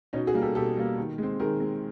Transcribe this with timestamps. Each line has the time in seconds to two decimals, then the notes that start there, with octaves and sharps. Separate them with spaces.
0.13 B2 C#4 D#4
0.27 F#4 G#4
0.34 G3 A#3
0.42 G4 A4
0.55 B2 G4 A4
0.77 G3 A#3
0.98 D#3
1.18 G#3 C4
1.40 D#3 G#4 A#4
1.60 G#3 C4